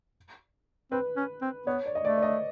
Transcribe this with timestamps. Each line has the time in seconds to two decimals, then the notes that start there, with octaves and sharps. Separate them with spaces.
0.91 C4 B4
1.16 C#4
1.42 C4
1.66 B3 C#5
1.86 D5
1.95 D#5
2.03 A3 D5
2.18 D5
2.23 D#5